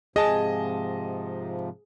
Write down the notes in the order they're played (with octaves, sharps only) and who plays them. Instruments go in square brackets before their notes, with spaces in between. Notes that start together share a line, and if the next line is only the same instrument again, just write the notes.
[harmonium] G#2 C3 F3 [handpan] G#4 [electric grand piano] D#5 A5